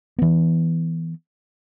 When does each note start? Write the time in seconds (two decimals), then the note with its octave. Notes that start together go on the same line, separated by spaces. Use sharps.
0.18 E3 B3